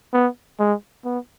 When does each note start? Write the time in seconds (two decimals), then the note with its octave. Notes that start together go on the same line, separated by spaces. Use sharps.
0.14 B3
0.59 G#3
1.05 B3